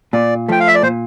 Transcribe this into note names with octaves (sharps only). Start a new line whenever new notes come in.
A#2 D5
F3 A3 G5
F5
E5
D5
A#2 C5